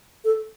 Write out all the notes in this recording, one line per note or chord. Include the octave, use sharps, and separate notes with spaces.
A4